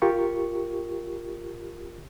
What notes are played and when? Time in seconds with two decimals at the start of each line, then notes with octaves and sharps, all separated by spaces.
0.02 F4 G4 A#4 C#6